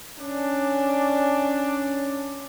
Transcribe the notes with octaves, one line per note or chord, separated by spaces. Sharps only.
C#4 D4